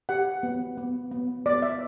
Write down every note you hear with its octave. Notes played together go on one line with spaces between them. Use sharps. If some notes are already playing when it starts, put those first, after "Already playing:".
G4 F#5
B3
B3
B3
B3 D5
E5